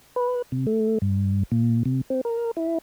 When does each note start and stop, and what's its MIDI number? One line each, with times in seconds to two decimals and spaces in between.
0.16 0.42 71
0.52 0.66 48
0.67 0.98 57
1.02 1.43 43
1.52 1.83 46
1.86 2.01 48
2.10 2.21 60
2.25 2.51 70
2.57 2.78 64